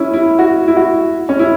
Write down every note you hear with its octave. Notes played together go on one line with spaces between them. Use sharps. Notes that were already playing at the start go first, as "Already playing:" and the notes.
Already playing: C#4 E4
E4
F#4
E4
F#4
C#4
E4